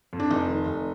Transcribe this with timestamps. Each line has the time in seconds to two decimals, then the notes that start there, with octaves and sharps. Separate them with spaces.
0.13 F2
0.20 D4
0.30 F1 D#4
0.49 D#3
0.67 F1